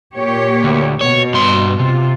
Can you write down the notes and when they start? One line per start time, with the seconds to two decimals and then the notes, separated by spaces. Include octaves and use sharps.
0.16 A#2 G4 C#5
0.64 D2
1.01 B2 C#5
1.34 G2 C6
1.80 C3 F4